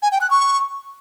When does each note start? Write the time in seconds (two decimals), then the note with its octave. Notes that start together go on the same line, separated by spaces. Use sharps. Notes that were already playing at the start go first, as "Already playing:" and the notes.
0.02 G#5
0.12 G5
0.21 F#6
0.30 C#6